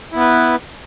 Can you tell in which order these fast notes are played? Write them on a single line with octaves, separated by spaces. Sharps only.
E4 B3 B4